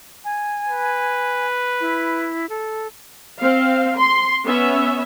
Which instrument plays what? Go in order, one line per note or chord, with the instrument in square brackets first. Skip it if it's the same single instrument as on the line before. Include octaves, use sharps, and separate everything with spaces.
[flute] G#5
[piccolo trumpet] B4
[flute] E4
A4
[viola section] C4 F5
C6
B3 C#4 E5